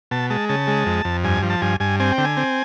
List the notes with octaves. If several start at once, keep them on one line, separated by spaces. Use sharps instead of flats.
B2 A5
G#3 A5
C#3 A5
G#3
F2
F2
G2 G#5
F3
A5
G2 G#5
G2 G#5
C4 G#5
G5
D3
G#5
C4